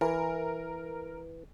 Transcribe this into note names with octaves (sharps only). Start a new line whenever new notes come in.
E3 A#4